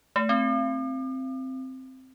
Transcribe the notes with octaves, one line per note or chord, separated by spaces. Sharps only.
A3
C4